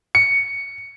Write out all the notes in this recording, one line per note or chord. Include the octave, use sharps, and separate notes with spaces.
C#7